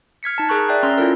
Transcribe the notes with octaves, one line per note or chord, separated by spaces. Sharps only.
F6 G#6 B6 C#7
D#4 A5 G#6
G#4 A#4 A#5 C#6 F#6
D5 E5 G5 F#6 G6 C7
C#4 A#5 C6 E6 F6
C#4 E4 F4 A4 A#4